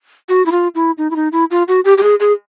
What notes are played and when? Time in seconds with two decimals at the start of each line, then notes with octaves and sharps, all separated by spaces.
0.29 F#4
0.46 E4
0.52 F4
0.75 E4
0.98 D#4
1.11 E4
1.16 D#4
1.32 E4
1.51 F4
1.68 F#4
1.85 G4
1.98 G4
2.03 G#4
2.20 G#4